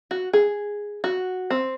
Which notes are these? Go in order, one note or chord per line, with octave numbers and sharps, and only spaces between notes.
F#4
G#4
F#4
C4